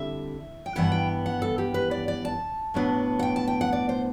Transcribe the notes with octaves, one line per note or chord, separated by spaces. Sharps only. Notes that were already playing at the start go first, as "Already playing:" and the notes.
Already playing: D3 G3 C4 E4 E5
G5
G2 E3 B3 E4 F#5
G5
F#5
A4
G4
B4
D5
D5
A5
A2 F#3 B3 D4
F#5
G5
A5
G5
F#5
D5
C5